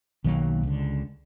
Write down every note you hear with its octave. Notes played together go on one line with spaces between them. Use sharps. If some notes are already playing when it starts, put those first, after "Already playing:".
B1 D#3 F#3 A#3
C#2 D3